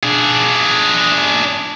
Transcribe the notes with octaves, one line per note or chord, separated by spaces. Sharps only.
D4 G#4